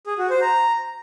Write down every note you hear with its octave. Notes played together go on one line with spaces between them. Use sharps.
G#4
F#4
C5
A#5